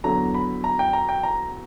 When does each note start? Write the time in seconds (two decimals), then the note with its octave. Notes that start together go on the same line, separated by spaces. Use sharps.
0.04 E2 D3 F#3 A#5
0.34 B5
0.64 A#5
0.79 G5
0.93 A#5
1.09 G5
1.23 A#5